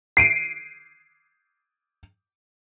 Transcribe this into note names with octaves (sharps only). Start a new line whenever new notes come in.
C7 D7 D#7